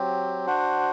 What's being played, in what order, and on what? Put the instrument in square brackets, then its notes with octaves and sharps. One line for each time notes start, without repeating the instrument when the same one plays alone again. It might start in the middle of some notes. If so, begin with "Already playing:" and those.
Already playing: [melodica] F#3 C4 G4
D4 F#4 C5 F#5